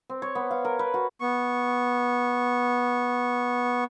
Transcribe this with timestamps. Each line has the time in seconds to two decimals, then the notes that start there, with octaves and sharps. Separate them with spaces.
0.10 C4
0.22 C#5
0.35 B3
0.51 F5
0.65 A#4
0.79 B4
0.94 F#4
1.20 B3 C#6